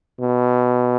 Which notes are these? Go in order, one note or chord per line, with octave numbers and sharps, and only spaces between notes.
B2